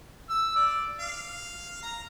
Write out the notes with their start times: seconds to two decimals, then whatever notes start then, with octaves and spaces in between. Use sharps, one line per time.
0.30 E6
0.56 D5
1.00 F5
1.82 A#5